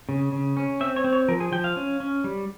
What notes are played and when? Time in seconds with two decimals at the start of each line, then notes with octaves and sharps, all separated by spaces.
0.09 C#3
0.33 C#3
0.57 C#4
0.81 C4 E5
0.96 C#5
1.04 C4
1.13 C#5
1.28 F3 A#4
1.40 G#4
1.52 F3 G5
1.64 F5
1.76 C#4
2.00 C#4
2.24 G3